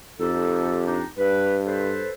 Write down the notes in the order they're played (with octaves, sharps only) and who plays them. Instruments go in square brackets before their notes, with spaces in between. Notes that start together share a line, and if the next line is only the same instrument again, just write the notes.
[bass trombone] F2 [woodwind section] D#4 G4 A4
[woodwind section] D4 D#4 G4
[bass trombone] G2 [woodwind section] B4
[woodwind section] A4 B4 C5